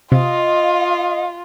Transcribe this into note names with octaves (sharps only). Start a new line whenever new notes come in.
C3 F4 D#5 F5